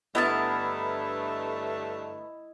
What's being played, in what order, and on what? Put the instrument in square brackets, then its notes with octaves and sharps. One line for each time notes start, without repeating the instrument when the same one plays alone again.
[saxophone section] G2 D3 A3 [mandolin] B3 A#4 A5 [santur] E4 D#5